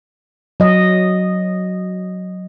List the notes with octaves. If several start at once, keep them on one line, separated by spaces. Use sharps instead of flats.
F#3 D#5